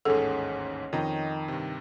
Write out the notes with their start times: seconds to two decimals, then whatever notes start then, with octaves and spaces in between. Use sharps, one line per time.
0.05 A1 D#2 G#2 C#4 G#4 A4 F#5
0.93 F2 D#3 D#5 A#5
1.48 G2 C3